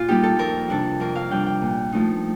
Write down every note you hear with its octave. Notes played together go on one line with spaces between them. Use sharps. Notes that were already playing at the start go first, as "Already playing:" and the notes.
Already playing: A#2 F4
G3 A#3 D#4 G4
A4
F2 A#4
C3 G3 D4 A4
F2 A#4
F5
C3 G3 D4 G5
G5
A#2
F3 A3 C4 D#4